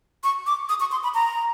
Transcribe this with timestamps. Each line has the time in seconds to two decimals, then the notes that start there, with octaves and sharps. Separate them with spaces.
0.23 C#6
0.46 D6
0.69 D#6
0.80 C#6
0.92 C6
1.03 B5
1.14 A#5